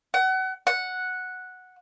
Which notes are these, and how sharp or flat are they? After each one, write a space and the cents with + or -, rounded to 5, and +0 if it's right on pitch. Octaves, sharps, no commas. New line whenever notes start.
F#5 +30
F#5 -5